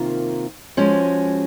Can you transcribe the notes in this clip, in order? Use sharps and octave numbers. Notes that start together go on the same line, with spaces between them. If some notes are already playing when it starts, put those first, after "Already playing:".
Already playing: C3 D#3 A#3 F4 A#4
F3 G#3 C#4 F#4